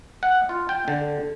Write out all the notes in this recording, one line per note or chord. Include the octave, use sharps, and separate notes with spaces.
F#5
F4
G5
D3